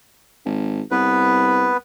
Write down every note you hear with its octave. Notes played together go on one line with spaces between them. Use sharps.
G#1
C2 B3 B4